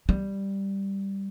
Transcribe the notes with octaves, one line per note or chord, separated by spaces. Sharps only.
G3